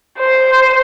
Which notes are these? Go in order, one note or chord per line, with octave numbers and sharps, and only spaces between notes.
C5